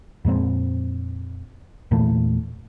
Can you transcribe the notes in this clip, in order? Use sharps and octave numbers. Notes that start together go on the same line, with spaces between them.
F2 A#2 G#3 C4
E2 A#2 E3 A3